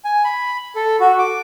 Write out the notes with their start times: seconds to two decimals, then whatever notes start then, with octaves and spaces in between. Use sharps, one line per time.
0.05 G#5
0.24 B5
0.76 A4
1.00 F#4
1.19 D6